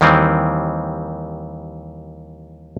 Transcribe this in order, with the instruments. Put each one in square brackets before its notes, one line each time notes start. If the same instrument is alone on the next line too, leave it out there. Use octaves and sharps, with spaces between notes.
[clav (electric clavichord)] D#2 D#3 E3 G3 C4